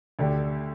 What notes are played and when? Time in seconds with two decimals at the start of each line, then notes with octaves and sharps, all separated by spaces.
0.19 D2 D3 A3 D4 G4